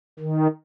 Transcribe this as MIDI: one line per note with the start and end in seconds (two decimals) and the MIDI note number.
0.20 0.47 51